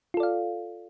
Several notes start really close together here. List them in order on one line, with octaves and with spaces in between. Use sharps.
F4 A4 D5 F5